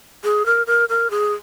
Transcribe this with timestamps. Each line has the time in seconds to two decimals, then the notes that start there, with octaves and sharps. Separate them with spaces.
0.24 G#4
0.46 A#4
0.67 A#4
0.89 A#4
1.11 G#4